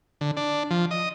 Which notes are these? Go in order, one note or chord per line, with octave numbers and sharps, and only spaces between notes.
D3
D4
F3
D#5